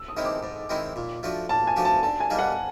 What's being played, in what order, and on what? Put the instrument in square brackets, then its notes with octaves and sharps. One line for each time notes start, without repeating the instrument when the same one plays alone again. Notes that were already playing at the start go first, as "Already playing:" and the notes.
Already playing: [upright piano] E6
D#6
[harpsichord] D#3 G#3 C4 E4
[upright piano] D6
[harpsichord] G#2
D#3 G#3 C4 E4
A#2
F3 A3 D4 F#4
[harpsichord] A#2 [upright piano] A5
[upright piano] G#5
[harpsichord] F3 A3 D4 F#4
[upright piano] A5
[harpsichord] D3 [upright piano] A5
[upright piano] G#5
[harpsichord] G3 A#3 D#4 G#4
[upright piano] F#5